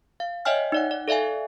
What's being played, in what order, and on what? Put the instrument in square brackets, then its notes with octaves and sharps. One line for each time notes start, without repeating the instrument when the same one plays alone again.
[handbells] F5
C#5 D#5 E5 G5 G#5 F6
D#4 D5 F#5
D5
A4 D5 E5 F5 G#5